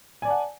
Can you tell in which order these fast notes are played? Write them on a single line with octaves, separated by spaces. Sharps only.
G#5 D5 A5 F#5